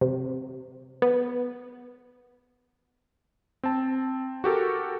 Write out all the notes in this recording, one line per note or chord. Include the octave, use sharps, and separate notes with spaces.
C3
B3
C4 A5
F#4 G4 A4 A#4